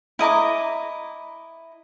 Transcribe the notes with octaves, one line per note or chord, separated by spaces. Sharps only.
E4 D#5 A#5 D6